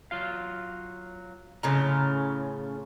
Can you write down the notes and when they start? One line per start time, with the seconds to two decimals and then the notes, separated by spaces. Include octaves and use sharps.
0.11 F#3 F4 F5
1.63 A2 C#3 C#4 F4 A#5